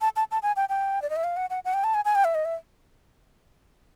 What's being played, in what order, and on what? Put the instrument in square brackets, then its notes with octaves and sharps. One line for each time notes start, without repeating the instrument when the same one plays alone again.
[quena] A5
A5
A5
G#5
G5
G5
D5
D#5
E5
F5
F#5
F#5
F#5
G5
A5
G#5
G#5
G5
E5
D#5
E5